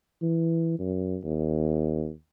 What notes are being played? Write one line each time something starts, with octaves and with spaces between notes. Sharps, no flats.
E3
F#2
D#2